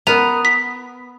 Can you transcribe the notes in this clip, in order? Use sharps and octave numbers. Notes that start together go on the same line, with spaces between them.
B3 A#4 F7
B6